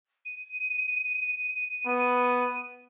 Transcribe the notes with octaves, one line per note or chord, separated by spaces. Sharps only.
D#7
B3